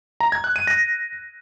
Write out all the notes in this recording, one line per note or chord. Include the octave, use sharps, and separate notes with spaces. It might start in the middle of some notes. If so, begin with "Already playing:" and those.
A#5
G#6
F#6
D#7
A#6